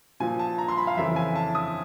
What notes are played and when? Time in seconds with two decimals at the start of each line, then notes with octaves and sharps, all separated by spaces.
0.20 A#2 F3 G#5
0.39 A5
0.58 A#5
0.68 C6
0.78 B5
0.87 F5
0.97 F2 C#3 E3 E5
1.16 G#5
1.36 A5
1.55 D#6